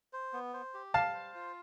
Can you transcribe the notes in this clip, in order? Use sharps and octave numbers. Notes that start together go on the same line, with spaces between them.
C5
B3
C5
G4
G3 F5 A5
C5
F4